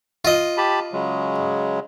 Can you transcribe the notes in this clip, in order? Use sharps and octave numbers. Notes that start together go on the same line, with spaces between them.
F4 D#5
G4 A5 B5
C#3 F#3 G#3